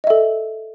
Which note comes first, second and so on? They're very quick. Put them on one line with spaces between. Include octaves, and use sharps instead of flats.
D#5 E5 A4